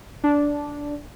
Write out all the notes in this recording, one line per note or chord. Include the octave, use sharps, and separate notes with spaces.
D4